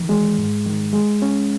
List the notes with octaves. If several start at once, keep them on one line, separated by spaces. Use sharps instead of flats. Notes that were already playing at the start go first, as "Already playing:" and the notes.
Already playing: D#3 E3
G#3
G#2
D#3
G#3
C#4